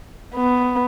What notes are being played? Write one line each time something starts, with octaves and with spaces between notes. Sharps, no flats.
B3